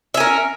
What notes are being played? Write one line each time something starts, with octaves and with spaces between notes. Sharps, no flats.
C#4 A#4 E5